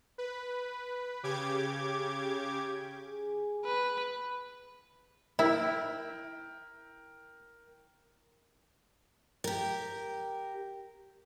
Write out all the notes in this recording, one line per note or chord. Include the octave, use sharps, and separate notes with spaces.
B4
C#3 G4 D6 G#6
G#4
B4
E4 A#4 G5
G4 A#4